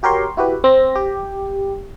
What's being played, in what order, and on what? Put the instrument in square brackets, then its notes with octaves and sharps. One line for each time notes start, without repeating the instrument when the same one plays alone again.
[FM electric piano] F#4 G4 A#4 C#5 C6
E4 F#4 G4 B4
C4 A#6
G4